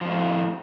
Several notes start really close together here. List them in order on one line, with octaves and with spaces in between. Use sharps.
F3 F2 A2